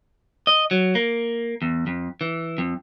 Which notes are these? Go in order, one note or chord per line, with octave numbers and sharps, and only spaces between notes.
D#5
F#3
A#3
E2
F2
E3
F2